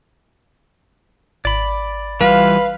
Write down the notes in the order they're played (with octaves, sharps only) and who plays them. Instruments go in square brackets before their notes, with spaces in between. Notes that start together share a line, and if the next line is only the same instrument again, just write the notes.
[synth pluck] G#1 [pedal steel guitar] D5 B5
[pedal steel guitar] E3 G3 F4 [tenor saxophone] B4 [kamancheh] F5